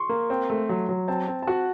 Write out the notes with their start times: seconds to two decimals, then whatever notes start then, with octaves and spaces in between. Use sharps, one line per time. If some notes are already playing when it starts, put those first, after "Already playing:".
Already playing: C6 C#6
0.09 A#3
0.30 C4
0.50 A3
0.69 F#3
0.89 F#3
1.08 C4 A5
1.28 C4
1.42 A5
1.47 F#4 F#5